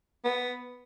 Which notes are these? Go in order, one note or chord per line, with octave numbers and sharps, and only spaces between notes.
B3